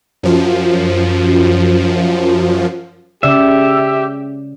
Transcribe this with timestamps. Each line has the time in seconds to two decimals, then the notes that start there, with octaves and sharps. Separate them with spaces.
0.23 F#2 F3
3.23 C#3 G4 D5 E5